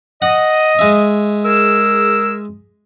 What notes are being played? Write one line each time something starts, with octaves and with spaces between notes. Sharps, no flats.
D#5 F#5
G#3 E5
G#4 A#4 E6